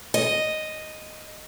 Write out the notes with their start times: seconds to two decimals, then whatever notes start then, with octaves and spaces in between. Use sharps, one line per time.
0.14 D#5